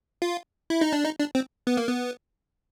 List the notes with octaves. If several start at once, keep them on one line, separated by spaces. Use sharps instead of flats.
F4
E4
D#4
D4
D#4
D4
C4
B3
A#3
B3